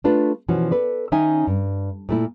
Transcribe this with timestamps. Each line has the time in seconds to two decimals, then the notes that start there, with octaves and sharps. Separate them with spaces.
0.04 A3 D4 F4 B4
0.48 B2 E3 F3 C#4 F#4
0.71 A4 B4 D5
1.12 D#3 C#4 D#4 E5 G5 G#5
1.47 G2
2.09 A#2 A3 E4